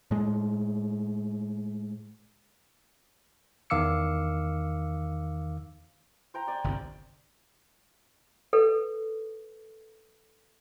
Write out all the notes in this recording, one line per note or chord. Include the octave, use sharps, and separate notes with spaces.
A2 G#3
E2 D#3 F5 D6 E6 C#7
C5 G5 A#5
D5 G5 G#5
G1 C2
A4 B4